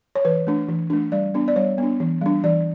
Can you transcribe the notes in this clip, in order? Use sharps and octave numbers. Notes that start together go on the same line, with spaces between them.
C#5
E3 B4
A3 D4
E3
A3 D4
G3 D5
B3 D4
D5
G3 C#5
B3 D4
E3
G3 D4
E3 D5